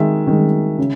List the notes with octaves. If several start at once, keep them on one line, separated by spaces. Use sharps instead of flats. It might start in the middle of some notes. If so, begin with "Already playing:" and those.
Already playing: D#3 G#3 E5
D#3 G#3
C#3